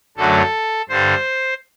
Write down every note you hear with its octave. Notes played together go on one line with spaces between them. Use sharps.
F#2 D3 F#3 A3 A4
G2 D3 G3 C5